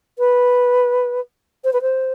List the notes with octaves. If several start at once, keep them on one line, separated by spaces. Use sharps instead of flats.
B4
C5
B4
C5